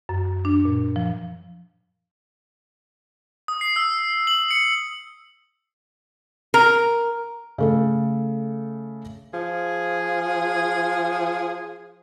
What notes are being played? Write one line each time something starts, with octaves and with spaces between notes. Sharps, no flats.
F#2
D4
A#2
F3
D#6
C7
E6
F#7
C#7
A#4
C#3 A3 A4
F3 G#4